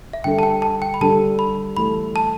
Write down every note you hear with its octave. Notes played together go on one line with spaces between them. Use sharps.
E5
D3 G3 D4 A4 G5
A5
G5
A5
G5
B5
D3 G3 D4 A4 A5
B5
E3 A3 E4 A4 B5
A5